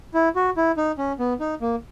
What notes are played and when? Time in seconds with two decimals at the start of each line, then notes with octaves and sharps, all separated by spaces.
0.14 E4
0.36 F#4
0.57 E4
0.77 D#4
0.98 C#4
1.19 B3
1.40 D#4
1.61 A#3